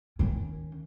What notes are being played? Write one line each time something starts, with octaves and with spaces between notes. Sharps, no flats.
D#3 C#4